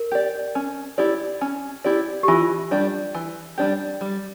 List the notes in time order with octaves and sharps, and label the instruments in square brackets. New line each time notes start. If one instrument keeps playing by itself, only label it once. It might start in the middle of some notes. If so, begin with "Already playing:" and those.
Already playing: [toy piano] A#4
[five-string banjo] G4 D5
C#4
E4 G4 D5
C#4
E4 G4 D5
[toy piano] G4
[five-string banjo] E3 [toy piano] F4
[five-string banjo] G3 D4 G4
E3
G3 D4 G4
G3